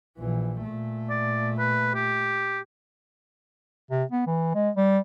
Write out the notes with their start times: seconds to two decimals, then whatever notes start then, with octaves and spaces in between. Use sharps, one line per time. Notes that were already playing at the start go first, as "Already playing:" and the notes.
0.18 A#1 E3
0.63 A#2 A3
1.09 D5
1.58 B4
1.94 G4
3.91 C3
4.12 B3
4.26 E3
4.55 G#3
4.77 G3